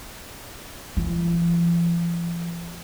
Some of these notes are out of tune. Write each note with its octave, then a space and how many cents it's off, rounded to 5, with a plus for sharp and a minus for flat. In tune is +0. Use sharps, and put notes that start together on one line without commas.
F3 -45